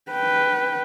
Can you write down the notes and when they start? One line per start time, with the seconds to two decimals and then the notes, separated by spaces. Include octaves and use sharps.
0.11 B4 G5